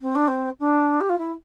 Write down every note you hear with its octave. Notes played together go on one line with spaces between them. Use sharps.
C4
D4
C4
D4
G4
F4
E4